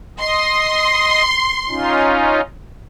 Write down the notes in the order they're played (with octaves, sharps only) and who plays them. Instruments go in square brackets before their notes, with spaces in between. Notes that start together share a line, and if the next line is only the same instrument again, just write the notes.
[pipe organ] D#5 [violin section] C6
[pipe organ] C#4 D#4 F4